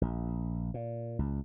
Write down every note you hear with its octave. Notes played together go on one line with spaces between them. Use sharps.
A#1
A#2
C#2